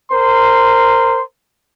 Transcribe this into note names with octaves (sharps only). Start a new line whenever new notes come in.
A#4 C5 C6